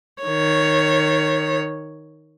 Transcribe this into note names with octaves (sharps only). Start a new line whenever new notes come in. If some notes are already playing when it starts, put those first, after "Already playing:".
D#3 C#5